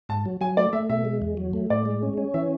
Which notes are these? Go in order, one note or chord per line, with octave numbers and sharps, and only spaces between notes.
G#2 A5
F#3
F#3 G#5
A3 D5
A3 E5
B2 E5
G#3
E2
F#3
A3
A2 D5
G#3
C#4
C#4
E3 E5